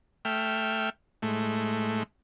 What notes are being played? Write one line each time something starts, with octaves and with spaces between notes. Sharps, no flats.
A3 E5 G5 F6
A2 G#3 A3